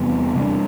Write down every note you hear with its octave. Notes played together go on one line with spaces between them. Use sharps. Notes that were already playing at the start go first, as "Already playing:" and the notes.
Already playing: E2 C3 G3 B3
C3 G3 D4